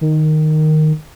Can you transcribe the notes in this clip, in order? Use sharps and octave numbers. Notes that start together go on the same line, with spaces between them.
D#3